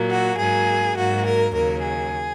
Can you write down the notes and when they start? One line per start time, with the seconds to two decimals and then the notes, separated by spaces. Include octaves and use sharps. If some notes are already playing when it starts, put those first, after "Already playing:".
Already playing: A#2 F#3 A#3
0.09 F#4
0.37 G#2 F#3 A#3 G#4
0.95 G#2 F#3 A#3 F#4
1.25 A#4
1.53 D#2 C#3 F#3 A#3 A#4
1.82 G#4